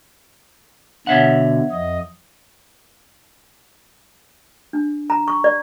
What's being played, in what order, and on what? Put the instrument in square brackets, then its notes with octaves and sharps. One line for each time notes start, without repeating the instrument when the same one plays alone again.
[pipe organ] B2 D3 [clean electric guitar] C#5 E5 F#5
[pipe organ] F2 D#5
[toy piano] D4
A#5
C#6
D5